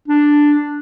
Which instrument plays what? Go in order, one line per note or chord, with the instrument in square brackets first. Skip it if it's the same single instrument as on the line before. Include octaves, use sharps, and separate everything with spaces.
[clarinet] D4